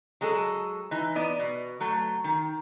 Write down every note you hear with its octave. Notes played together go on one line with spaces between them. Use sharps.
F#3 G#3 G#4 A4
E3 D#4
B3 D5 D#5
B2
F#3 A3
D#3